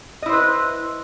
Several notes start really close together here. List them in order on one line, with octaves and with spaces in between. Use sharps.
D#5 E4 C5 B4